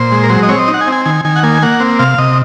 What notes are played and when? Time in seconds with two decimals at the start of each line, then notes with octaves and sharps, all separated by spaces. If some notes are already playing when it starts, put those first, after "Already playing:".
Already playing: A#2 C5
0.12 G#3
0.24 A#4
0.30 F#3 C5
0.43 D#5
0.49 C4 C#5
0.59 D#5
0.68 D#4
0.74 F#5
0.81 G#5
0.87 C4
0.92 G#5
1.05 D#3 G#5
1.25 D#3 G#5
1.36 F#5
1.43 A#3 G#5
1.63 A#3 F#5
1.80 C4
1.99 C3 F5
2.18 C3 D#5